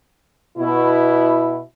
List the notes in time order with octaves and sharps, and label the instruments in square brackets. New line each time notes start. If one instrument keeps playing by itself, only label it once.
[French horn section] B2 E4